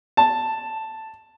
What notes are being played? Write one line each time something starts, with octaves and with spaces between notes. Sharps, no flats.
A5